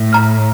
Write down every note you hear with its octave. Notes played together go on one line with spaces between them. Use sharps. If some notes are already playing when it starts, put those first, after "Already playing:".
Already playing: A2
A#5 F6